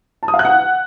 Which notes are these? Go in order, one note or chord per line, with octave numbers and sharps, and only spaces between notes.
A5
D#6
F5
F#6
F#5